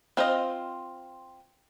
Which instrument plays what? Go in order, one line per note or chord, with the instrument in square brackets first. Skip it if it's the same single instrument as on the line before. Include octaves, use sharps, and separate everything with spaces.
[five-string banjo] C4 F4 C5 D#5